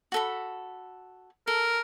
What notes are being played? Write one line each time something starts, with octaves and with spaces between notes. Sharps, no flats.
F#4 A4 B5
A4 A#4